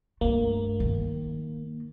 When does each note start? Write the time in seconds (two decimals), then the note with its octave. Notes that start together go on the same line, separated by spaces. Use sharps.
0.21 G2 A3 A#3
0.80 D#3